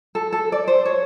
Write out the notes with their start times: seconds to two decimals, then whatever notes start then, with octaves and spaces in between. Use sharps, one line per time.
0.15 A4
0.32 A4
0.52 D5
0.68 C5
0.85 C#5